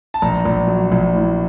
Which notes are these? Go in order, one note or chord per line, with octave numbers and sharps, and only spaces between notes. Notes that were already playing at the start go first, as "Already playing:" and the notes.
A5
A#1 A#5
A#1
F#3
A#1
A2